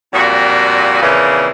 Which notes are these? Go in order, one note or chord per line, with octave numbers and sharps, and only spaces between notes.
F2 A#2 G3 F#4
F2 A#2 C#3 E3